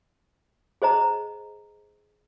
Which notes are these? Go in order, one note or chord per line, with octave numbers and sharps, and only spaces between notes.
G#4 C5 D#5 A#5